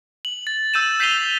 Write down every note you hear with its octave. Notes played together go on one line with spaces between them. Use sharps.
F#7
A6
E6 G6 D#7 E7
G6 B6 C7 D#7 F7 G7